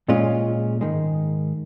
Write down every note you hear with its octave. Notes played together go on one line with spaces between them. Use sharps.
A#2 G#3 C#4 F4
G#2 D#3 G#3